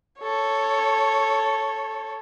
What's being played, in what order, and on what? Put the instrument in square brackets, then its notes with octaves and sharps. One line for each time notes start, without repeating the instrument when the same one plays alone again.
[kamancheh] A4 C#5